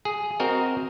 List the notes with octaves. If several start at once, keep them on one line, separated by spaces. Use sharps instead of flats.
G#4
C4 F#4 A#4 D#5